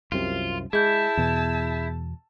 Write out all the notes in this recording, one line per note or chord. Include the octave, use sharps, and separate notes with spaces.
C2 F#2 C3 F4
G#3 E4 G#4 A5 E6 G6
E2 B2